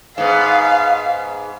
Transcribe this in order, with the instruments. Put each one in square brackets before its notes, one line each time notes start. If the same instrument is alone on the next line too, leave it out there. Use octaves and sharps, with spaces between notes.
[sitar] G#2 B3 [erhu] F5